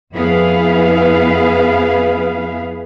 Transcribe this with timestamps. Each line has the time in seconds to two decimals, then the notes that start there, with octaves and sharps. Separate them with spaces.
0.14 F2 B3 E4 G#4 B4 F5